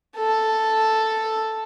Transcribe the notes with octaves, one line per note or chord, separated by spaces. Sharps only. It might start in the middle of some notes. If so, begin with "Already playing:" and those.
A4